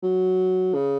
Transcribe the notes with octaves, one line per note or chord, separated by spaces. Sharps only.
F#3
C#3